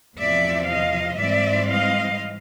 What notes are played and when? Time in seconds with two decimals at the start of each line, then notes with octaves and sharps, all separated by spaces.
0.17 E2 C3 F3 D5 E5
0.68 D#5 F5
1.18 G#2 E3 G3 C4 D5 E5
1.69 D#5 F5